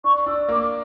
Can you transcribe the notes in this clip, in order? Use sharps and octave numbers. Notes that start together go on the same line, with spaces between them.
D4 C#6
D4 E6
A#3 D6